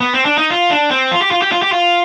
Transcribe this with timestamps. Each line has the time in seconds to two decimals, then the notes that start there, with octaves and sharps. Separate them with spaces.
0.00 B3
0.14 C4
0.25 D4
0.38 D#4
0.50 F4
0.71 D4
0.91 C4
1.11 F4
1.22 G4
1.31 F4
1.42 G4
1.52 F4
1.62 G4
1.72 F4